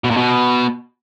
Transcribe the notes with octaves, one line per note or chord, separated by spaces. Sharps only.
B2
A#2
B2